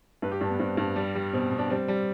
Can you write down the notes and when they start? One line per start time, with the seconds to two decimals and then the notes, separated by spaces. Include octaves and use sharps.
0.22 G2 B4
0.31 G4
0.41 G2 D4
0.50 B3
0.59 G2 C4
0.77 G2
0.96 G3
1.15 G3
1.33 B2 C4
1.51 B2
1.58 D4
1.70 G3 C4
1.88 G3